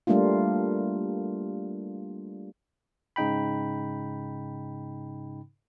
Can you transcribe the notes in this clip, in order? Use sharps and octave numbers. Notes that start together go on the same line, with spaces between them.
G3 A3 A#3 D4 F4
G#2 C#3 D#4 G5 B5